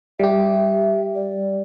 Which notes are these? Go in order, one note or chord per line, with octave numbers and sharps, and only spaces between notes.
G3 G4 E5
D5